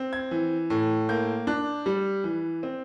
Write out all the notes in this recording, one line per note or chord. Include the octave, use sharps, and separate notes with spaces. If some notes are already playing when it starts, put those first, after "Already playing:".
Already playing: C4
G#6
E3
A2
A#3 G6
D4 F#6
G3
E3
C4